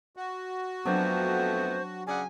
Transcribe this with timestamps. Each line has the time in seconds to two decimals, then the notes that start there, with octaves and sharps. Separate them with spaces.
0.16 F#4
0.86 F2 F#3 A3 B3 C4 D4 C5
2.07 C#3 D5 F#5 G#5